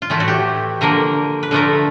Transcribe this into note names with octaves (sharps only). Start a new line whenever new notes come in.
F4
A2 E3 A3 E4
F#4
G4
D3 F3 A#3 A#4
B4
D3 F3 A3 A#4